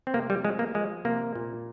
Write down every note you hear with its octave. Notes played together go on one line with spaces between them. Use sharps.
C4
C3 A#3
G3
F3 G#3
A#3
F3 G#3
C3 A#3
A#2